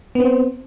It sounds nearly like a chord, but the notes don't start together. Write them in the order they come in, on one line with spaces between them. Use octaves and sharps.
B3 C4 C5